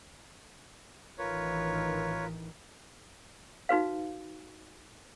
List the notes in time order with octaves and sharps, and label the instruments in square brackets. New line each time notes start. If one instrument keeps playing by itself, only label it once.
[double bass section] A1 D#3 E3 [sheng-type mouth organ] F4 A#4 B4 [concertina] C#5
[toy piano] D#4 F#4 B4 F5